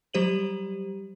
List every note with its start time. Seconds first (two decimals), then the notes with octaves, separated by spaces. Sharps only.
0.14 F#3 G3 G4 C5 D#7 F#7